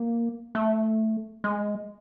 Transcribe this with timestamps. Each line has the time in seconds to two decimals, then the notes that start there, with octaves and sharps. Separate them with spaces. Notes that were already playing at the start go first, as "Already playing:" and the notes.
Already playing: A#3
0.55 A3
1.44 G#3